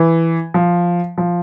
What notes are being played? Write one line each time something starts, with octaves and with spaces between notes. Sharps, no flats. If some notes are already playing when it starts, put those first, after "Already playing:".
Already playing: E3
F3
F3